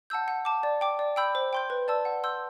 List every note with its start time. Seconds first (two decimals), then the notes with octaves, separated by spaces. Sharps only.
0.10 F#5 A5 E6 G6
0.28 F#5
0.45 A5 D6
0.63 D5
0.81 G5 D6
0.99 D5
1.16 G5 B5 E6 G6
1.35 C5
1.53 G5 C6 G6
1.70 B4
1.88 D5 A5 E6
2.05 F#5
2.24 C6 E6 G6